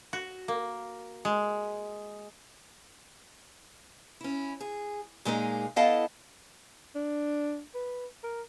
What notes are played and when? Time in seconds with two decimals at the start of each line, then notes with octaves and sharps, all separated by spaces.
0.13 F#4
0.48 A#3
1.25 G#3
4.21 C#4 E4
4.60 G#4
5.25 A#2 G#3 A#3 D#4
5.76 B3 E4 A4 D#5 F5 A5
6.95 D4
7.75 B4
8.23 A#4